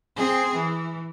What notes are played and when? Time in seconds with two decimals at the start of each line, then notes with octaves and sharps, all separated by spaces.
0.16 C4 G#4
0.56 E3